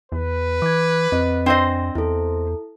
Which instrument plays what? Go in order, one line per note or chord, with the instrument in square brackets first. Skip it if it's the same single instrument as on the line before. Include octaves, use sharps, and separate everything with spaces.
[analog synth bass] E2 [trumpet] B4
[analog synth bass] E3 [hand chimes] D6 G#6
[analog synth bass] F2 [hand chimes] C4 D#5
[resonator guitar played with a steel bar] C4 C5 D#5 [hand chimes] D4
[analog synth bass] E2 [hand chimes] E4 A4